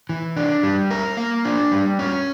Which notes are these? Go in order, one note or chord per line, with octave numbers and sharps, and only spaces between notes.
E3
D4
G3
A#4
A#3
D4
G3
C#4